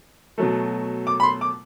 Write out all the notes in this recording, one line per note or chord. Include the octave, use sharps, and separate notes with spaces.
B2 F#3 A3
D6
B5
C6
D6